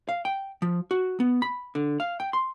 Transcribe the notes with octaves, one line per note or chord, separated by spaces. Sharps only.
F5
G5
F3
F#4
B3
B5
D3
F5
G5
C6